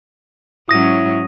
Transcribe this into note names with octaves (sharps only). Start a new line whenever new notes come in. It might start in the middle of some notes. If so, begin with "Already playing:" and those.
G#2 F#3 C#4 E4 D#6 A#6 D#7